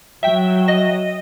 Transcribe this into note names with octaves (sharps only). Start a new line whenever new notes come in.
F#3 E5 G5
D#5 A#6